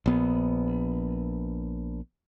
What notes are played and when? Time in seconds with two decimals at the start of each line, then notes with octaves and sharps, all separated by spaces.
0.06 A#1 B3